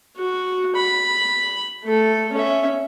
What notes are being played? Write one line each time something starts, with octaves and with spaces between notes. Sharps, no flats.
F#4
B5
A3 A4
C#4 E5